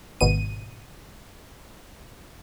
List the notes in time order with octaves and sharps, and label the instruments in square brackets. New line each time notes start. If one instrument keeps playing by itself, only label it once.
[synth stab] G#1 B2 D#7